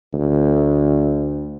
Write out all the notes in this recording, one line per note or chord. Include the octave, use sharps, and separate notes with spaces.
D2